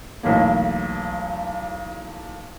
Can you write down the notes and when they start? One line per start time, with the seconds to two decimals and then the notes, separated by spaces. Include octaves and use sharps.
0.23 B1 E2 A3 A#3